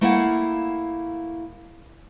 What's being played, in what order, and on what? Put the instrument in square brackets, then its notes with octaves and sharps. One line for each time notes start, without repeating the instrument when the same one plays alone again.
[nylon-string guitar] A3 A#3 E4 F5 F#5